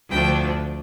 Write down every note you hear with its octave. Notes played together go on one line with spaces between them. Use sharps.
D2 D3 F3 A3 D4 G5